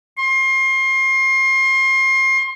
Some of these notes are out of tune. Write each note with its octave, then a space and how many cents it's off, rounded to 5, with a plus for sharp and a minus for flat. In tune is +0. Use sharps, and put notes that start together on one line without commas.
C6 +30